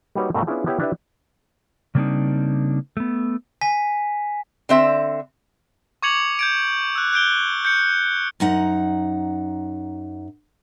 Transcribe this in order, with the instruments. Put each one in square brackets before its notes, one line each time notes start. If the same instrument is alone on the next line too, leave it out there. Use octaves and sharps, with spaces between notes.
[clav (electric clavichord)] G3 A#3 D#4 F#4 B4 C#5
G2 B2 A3 A#4 F5 A#5
B3 C#4 D4 E4 F4 G#4
B3 E4 G4 C#5 F#5 G5
D4 E4 G4 B4 D5 E5
[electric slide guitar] C#3 G3 A#3 C4 D4 D#4
A3 B3
[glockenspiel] G#5 B6
[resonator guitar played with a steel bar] D3 C4 E5
[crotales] C#6 D6 G#6 C#7 F7 F#7
G6 G#6 D7
E6 F#6
F#6 G6 D7 G7
G6 C#7
[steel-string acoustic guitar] F#2 D#4 F#5